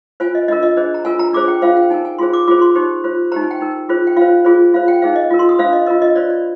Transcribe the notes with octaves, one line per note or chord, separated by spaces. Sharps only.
F4 C5 G#5
D#5
D4 F4 A#4 D#5
D#5
D4 G#4 C5 D#5
A#5
F4 A#4 G#5
A#5
D4 F4 G#4 C5 D6
G5
F4 C5 F5
G5
D#4 A#4 G#5
G#5
F4 G#4 C5 C6
D6
F4 G#4 C5 D6
C6
D#4 G4 C5
F4 C5
D#4 G4 C5 A#5
G#5
G5
D#4 A#4
F4 G#4 C5
G5
F4 C5 F5
F4 G#4 C5
F4 C5 F5
G5
D#4 G#4 C5 F5
D#5
F4 A#4
C6
D#6
D4 F4 C5 F5
D#5
F4 A#4 D#5
D#5
F4 C5 D5
D5